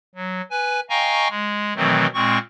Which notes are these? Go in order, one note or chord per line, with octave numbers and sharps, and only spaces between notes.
F#3
B4 G#5
D#5 F5 G5 G#5 A#5 C#6
G#3
B2 D#3 E3 F#3 A3 C4
A#2 G#3 C4 C#6